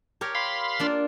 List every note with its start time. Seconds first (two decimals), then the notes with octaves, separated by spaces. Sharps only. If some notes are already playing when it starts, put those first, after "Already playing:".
0.21 G4 A#4 C#5
0.35 F5 B5 C6
0.79 A#3 D4 F4